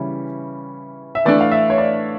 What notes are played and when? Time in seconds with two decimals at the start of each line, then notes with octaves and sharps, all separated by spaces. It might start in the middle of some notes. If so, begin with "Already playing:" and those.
Already playing: C#3 E3 G3 C#4 E4
1.15 E5
1.25 E3 A3 D4 D5
1.40 F5
1.51 E5
1.70 C#5
1.78 D5